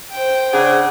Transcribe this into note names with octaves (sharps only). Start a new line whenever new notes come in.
C5 G5
C#3 D4 G#4 F#5